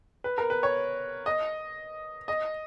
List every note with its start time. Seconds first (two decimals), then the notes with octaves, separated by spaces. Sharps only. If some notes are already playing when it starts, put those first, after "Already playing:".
0.24 B4
0.38 A#4
0.50 B4
0.63 C#5
1.26 D#5
2.28 D#5